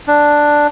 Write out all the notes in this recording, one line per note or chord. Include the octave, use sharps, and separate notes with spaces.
D4